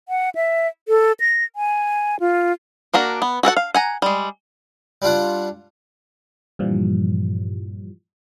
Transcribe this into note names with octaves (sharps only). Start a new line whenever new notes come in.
F#5
E5
A4
A#6
G#5
F4
A#3 D4 F#4 A#4
B3
F#4 A4 A#4 F#5
F5
F#5 G#5 A#5
G3 G#3
G3 D4 F4 F#5
G2 A#2 E3 F3 G3